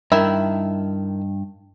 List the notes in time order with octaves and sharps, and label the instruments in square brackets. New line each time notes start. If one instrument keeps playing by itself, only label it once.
[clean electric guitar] G2 [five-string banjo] D#3 E4 E5